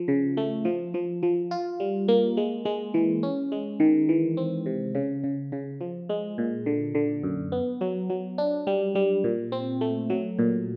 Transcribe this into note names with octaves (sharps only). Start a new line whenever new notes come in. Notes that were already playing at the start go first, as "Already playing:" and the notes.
Already playing: F3
C#3
A3
F3
F3
F3
F4
G3
A#3
G#3
G#3
E3
C#4
G#3
D#3
E3
C4
C3
C#3
C#3
C#3
F3
G#3
A#2
D3
D3
F#2
B3
F#3
F#3
D4
G3
G3
A#2
C4
A3
F#3
A#2